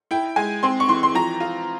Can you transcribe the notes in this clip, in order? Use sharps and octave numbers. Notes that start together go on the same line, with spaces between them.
E4 G5
G#3 G#5
C4 C6
C#6
E3 C6
C6
F3 A#5
F4